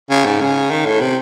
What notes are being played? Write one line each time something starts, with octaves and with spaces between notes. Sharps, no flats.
C#3
G#2
C#3
D#3
A2
C3